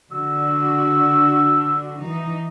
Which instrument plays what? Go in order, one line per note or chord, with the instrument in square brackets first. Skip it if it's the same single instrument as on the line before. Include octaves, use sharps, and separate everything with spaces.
[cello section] D3 D4 F#4 [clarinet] E6
[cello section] E3 D#4